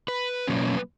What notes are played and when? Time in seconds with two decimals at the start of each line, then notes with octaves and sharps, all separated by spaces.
0.08 B4
0.48 B2 F#3 A#3 C#4